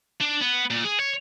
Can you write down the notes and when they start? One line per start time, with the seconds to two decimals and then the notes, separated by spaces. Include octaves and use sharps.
0.21 D4
0.41 B3
0.71 A#2
0.84 G#4
1.00 C#5